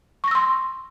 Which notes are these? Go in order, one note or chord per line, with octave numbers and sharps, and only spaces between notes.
C6 C#6 E6 A#6